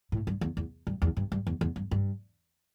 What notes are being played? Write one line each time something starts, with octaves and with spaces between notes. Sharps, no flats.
A2
G2
E2
E2
G2
E2
G2
G2
E2
E2
G2
G2